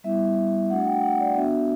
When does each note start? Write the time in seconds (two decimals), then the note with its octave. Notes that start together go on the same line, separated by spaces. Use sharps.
0.04 G3 B3 E4 E5
0.70 A3 D4 F#4 F#5
0.86 G5
1.03 F#5
1.20 D5
1.36 B3 D4 F#4 E5